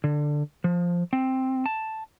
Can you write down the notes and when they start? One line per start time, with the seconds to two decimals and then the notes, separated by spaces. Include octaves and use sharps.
0.04 D3
0.64 F3
1.13 C4
1.66 A5